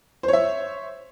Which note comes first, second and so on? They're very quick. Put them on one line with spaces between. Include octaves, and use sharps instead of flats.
C5 C#5 E5